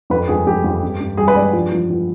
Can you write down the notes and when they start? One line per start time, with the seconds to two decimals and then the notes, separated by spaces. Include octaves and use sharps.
0.10 F2 B4
0.28 F2 G#4
0.46 F2 G4
0.64 F2
0.83 G2
1.00 G2
1.17 G3 G#4
1.28 B4
1.36 G2 D5
1.53 F3
1.72 F3
1.90 F3